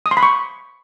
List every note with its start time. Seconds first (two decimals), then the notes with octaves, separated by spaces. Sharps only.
0.06 D#6
0.11 C6
0.17 B5
0.23 C#6